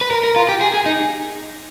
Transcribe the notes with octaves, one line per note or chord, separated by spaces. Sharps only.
B4
A#4
A#4
F4
G4
G#4
G#4
D#4